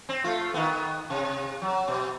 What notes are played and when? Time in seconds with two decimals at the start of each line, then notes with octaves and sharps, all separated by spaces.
0.09 C4
0.24 A3 F4
0.54 D#3 B3
1.10 C3
1.62 F#3
1.88 B2